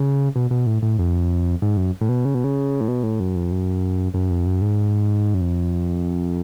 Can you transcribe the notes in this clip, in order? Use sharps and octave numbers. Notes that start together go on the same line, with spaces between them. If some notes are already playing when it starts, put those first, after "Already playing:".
Already playing: C#3
B2
B2
A2
A2
F2
G#2
F#2
A2
B2
C#3
B2
C#3
A2
B2
A2
F#2
F2
F#2
F#2
F2
F#2
G#2
F#2
F2